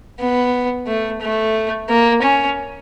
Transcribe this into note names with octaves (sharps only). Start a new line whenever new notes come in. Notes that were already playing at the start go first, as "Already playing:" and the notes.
B3
A3
A3
A#3
C#4